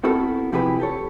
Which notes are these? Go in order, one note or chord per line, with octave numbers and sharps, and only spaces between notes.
B3 C4 E4 F#4 A4 A#4
C3 F3 E4 G4 G#4 B4
G4 A4 C#5